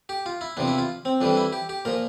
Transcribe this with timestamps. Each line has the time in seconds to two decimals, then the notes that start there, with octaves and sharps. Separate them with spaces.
0.09 G4
0.26 F4
0.41 E4
0.57 E2 C3 F3 D4
0.68 E4
0.78 F4
1.05 C4
1.21 F2 E3 G3 D4
1.37 E4
1.53 G4
1.69 G4
1.85 A#2 F3 A#4